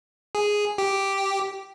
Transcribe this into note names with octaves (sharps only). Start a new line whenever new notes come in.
G#4
G4